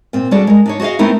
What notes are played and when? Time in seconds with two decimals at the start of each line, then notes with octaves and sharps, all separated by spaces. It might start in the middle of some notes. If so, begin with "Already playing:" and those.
0.13 A#2 C4
0.31 G3 D4 F#4 G#4 A4 D5
0.47 G#3 A#4
0.66 D4 D#4 C#5
0.80 F#4 G#4 C#5 D#5 F5
0.99 A3 B3 C4 D#4 E4 A#4